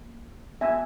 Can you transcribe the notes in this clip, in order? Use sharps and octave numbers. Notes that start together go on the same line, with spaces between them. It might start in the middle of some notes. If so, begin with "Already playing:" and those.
Already playing: A#3
B3 F#4 E5 G#5